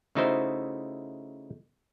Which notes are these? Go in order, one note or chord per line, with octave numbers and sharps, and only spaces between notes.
C#3 A3 D#4 E4 F#4 C5